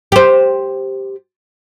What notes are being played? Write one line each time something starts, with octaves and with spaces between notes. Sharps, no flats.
G4 C5